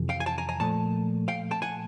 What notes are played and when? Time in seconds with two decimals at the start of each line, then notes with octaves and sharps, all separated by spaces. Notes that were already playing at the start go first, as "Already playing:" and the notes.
Already playing: F2 C3 E3
0.09 F5 G5
0.20 G#5
0.26 G5 A5
0.38 G#5 A#5
0.49 G#5 A#5
0.60 A#2 F3 A3 A5
1.28 F5 G5
1.51 G5 A5
1.62 F#5 G#5